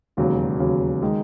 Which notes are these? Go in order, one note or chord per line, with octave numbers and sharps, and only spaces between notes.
E1 D#2 C#3 F#3
E1 D#2 C#3 F#3
D#3 G#3 D#4